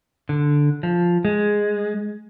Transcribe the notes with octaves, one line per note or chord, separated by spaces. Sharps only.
D3
F3
G#3